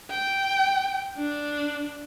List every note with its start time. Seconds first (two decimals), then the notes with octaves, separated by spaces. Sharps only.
0.10 G5
1.18 D4